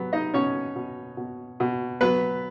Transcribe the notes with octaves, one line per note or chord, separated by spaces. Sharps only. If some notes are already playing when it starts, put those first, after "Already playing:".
Already playing: F#3 B3
D#4 D#5
B2 C#4 C#5
B2
B2
B2
F#3 B3 B4